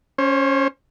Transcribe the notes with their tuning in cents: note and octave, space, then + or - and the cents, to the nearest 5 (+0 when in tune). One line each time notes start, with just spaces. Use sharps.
C#4 +0 C5 +35